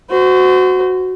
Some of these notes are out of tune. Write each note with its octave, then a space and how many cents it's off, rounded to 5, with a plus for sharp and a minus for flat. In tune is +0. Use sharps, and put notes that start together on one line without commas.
F#4 +0 C5 -35